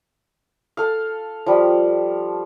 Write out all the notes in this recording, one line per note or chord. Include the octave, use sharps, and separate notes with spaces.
A4 F5
F3 G3